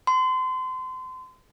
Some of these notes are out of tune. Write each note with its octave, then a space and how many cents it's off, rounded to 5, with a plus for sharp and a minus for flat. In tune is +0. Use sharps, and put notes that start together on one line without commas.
C6 -30